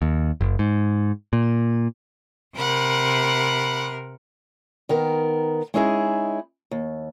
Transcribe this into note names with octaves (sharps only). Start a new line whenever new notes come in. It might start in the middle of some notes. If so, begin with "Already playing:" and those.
D#2
F#1
G#2
A#2
C3 A#4 F#5 B5
D#3 B3 A#4
G#3 C#4 D#4 E4 G4 G#4
D#2